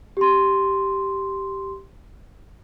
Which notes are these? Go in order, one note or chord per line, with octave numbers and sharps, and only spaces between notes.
G4 C6